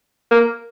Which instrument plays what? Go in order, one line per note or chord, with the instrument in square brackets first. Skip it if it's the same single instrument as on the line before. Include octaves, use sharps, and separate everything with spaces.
[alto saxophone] A#3